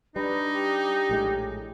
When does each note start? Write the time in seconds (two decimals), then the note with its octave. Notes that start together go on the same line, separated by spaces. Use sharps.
0.16 G3 D4 D#4 B4
0.52 G4
1.09 A#1 A2 G#3